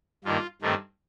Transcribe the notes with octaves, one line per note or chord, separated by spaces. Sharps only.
G2 D#3 A#3 F4
G2 D#3 A3 C4